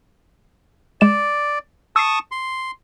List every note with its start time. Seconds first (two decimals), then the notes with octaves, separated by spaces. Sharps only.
1.01 G#3 D5 E7
1.96 A5 C#6 D#6 E6 C7
2.32 C6